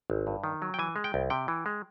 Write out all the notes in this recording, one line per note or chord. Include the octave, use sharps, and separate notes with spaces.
G#1
G2
D#3
F#3
G5
E3 G#5
G#3
G5
C2
C3 G5
E3
G#3